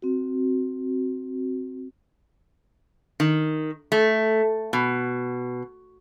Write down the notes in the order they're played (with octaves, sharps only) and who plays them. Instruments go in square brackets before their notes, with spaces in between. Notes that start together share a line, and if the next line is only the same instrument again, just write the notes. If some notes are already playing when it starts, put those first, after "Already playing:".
[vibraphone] C4 F#4
[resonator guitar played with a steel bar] D#3
A3
B2